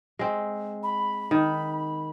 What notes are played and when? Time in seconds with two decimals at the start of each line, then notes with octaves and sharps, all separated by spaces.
0.19 G#3 C4
0.83 B5
1.31 D#3